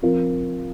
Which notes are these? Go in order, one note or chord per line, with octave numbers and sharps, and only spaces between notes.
F3 C4 F4 A#4